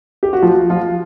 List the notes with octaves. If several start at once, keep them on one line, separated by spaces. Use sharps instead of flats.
G4
F#4
F3 F4
F3 F4